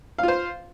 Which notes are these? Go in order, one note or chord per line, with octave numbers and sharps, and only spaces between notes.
F4 C5 F5